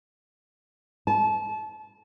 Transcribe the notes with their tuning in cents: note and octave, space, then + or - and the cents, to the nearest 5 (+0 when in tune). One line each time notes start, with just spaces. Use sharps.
A5 -30